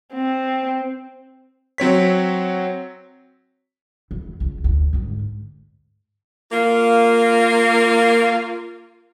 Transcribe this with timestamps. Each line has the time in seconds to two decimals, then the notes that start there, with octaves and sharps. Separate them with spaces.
0.14 C4
1.78 F#3 C4 C#5 B6
4.11 E2
4.40 C#2
4.64 D2
4.93 D2 G#2
6.52 A#3 F4